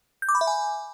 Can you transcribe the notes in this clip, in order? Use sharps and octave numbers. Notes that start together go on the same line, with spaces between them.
G6
D6
B5
E5
G#5